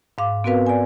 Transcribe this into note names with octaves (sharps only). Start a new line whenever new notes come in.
G#2 F5 D6
B3 C4 F#4 A#4 B4 F5
D5 G#5